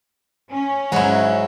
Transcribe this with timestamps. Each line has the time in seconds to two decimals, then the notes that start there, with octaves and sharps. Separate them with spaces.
0.49 C#4
0.92 G#2 F#3 E4